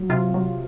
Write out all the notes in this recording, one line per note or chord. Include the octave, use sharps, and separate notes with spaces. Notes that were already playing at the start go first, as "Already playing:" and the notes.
Already playing: F#3
C3 F4
F#3